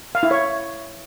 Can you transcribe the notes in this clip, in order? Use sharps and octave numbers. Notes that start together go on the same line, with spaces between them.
F5
E4
C#5